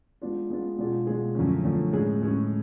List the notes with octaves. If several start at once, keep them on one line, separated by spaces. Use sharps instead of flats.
G#3 B3 D4 F4
G#3 B3 D4 F4
B2 G#3 D4 F4 G#4
B2 G#3 D4 F4 G#4
F#2 D3 F3 A3 C#4
F#2 D3 F3 A3 C#4
A2 G#3 C#4 G#4
A2 G#3 C#4 G#4